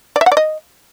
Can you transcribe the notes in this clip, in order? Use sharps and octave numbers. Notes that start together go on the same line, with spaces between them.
D5
E5
F#5
D5
D#5